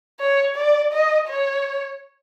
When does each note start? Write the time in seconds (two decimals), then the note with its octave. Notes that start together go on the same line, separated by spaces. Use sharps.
0.20 C#5
0.56 D5
0.92 D#5
1.28 C#5